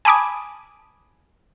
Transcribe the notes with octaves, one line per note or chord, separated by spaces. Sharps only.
G#5 A5 B5 D6 D#6 G#6